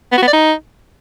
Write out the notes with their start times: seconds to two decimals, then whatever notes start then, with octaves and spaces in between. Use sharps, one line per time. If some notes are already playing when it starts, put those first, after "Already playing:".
0.12 B3
0.17 F#4
0.22 B3
0.28 D5
0.33 D#4